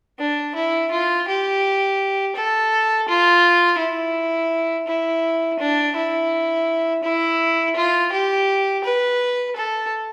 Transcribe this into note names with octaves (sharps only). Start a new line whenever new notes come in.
D4
E4
F4
G4
A4
F4
E4
E4
D4
E4
E4
F4
G4
B4
A4